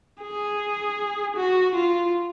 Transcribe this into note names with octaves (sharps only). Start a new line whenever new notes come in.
G#4
F#4
F4